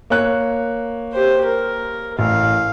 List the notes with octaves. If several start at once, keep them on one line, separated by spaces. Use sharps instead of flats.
A#3 C#5 F#6
G4 C5
A#4
A1 F5